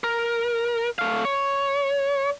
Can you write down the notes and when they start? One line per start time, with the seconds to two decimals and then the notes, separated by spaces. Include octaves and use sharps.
0.04 A#4
0.99 A3 F5
1.25 C#5